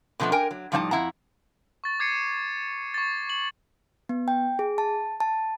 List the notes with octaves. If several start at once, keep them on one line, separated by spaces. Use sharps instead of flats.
B2 D3 F3 A3 B3 D4
A#4 G5 G#5
F#3
A2 F3 G3 D#4 E5 A5
F2 E4 F#5 A#5
C#6 A6
D6 G#6 C7 C#7 D#7
C#6 A6
F#7
B3
G5
G#4
A5
A5